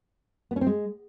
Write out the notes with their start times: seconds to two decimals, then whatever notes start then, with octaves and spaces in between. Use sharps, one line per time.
0.51 B3
0.56 C#4
0.61 C4
0.67 G#3